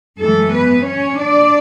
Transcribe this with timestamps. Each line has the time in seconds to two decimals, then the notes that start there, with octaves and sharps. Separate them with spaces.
0.19 F#2 E3 G#3 A3 A4
0.52 B3 B4
0.85 C#4 C#5
1.18 D4 D5